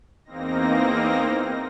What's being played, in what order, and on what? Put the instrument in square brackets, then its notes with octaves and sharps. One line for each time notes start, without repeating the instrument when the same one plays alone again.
[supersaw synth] E2 A#3 C4 D#4 A#6